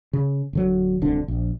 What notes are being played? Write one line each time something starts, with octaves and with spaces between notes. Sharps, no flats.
C#3
D1 D3 F#3
D1 C2 D3 D4
A#1